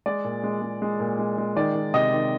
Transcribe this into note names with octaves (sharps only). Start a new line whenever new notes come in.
G#3 D5
A#2
G#3
G#3
G#3
A#2
G#3
G#3
D#3 D5
D#3
C3 D#5
D#3